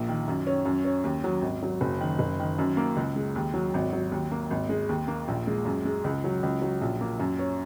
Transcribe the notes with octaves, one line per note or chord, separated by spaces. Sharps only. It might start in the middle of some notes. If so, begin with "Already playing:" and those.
Already playing: A#1 A#3
D#3
F#2
C#4
F#2
C#4
D#2
F#3
G#1
F#3
F#1
D#3
F#1
D#3
F#2
A#3
C#2
G#3
D#2
F#3
G#1
F#3
D#2
A#3
G#1
G#3
D#2
A#3
A#1
G#3
F#2
G#3
C#2
F#3
C#2
F#3
A#1
A#3
F#2
C#4